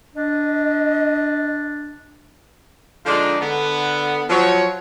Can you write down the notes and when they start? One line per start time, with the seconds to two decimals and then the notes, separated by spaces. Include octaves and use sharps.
0.15 D4 D#5
3.06 D3 F3 G#3 D4 D#4 F4
3.41 D3 B3
4.30 F3 F#3 C#5